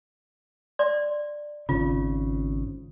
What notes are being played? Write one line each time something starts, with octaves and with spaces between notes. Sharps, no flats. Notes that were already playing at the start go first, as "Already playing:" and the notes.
D5 C6
G#1 C#3 F4